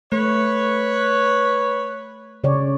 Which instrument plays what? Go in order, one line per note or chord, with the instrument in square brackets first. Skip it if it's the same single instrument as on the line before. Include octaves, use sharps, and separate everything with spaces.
[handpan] A3 [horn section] B4 C#5
[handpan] C#3 C#5 D5